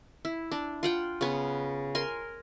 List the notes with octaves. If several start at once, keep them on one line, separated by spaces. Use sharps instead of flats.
E4
D4
F4 F#5 G5
C#3 B3
A#4 G#5 C6